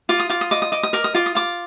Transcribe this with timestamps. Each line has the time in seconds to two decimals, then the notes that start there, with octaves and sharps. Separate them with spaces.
0.09 F4 D6
0.20 D#6
0.30 F4 D6
0.41 D#6
0.51 D#5 D6
0.62 D#6
0.72 D#5 D6
0.83 D#6
0.93 A#4 D6
1.04 D#6
1.14 F4 D6
1.26 D#6
1.35 F4 D6